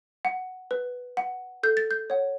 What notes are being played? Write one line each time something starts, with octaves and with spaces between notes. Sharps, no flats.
F#5
B4
F#5
A4 G6
A6
G6
C#5 F#5